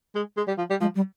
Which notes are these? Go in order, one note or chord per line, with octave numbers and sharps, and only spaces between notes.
G#3
G#3
G3
F3
G3
F3 G#3
G3